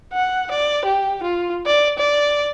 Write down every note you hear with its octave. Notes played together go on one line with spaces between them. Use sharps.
F#5
D5
G4
F4
D5
D5